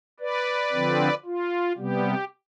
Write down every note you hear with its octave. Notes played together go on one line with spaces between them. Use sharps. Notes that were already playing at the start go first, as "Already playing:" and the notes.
B4 D5
D3 F3 C4
F4
C3 G3 B3 G4